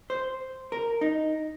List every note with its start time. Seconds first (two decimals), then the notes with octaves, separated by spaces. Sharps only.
0.10 C5
0.72 A#4
1.01 D#4